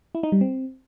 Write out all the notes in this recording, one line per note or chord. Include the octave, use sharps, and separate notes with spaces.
E4
D#4
G3
C4